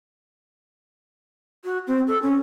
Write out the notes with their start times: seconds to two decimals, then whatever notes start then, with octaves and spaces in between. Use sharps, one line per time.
1.64 F#4
1.87 C4
2.07 A4
2.22 C#4